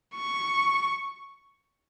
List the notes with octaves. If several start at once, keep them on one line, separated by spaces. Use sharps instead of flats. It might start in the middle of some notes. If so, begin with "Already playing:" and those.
C#6